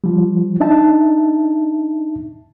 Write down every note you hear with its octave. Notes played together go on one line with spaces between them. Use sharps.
F3 G3
D4 D#4 E5 A5